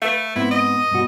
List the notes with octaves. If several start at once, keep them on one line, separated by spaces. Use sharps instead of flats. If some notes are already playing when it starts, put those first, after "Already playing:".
A3 B4 F5
G#2 B3 C4 E4
D#5
G2 B2 F#4